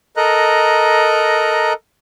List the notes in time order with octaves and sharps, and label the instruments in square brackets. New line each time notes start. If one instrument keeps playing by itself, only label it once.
[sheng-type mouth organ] A4 A#4 D#5 A#5 F#6